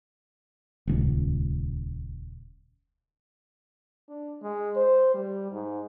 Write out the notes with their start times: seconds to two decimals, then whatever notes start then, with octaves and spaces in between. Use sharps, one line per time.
0.87 D#1 C#2
4.09 D4
4.42 G#3
4.76 C5
5.14 G3
5.52 G#2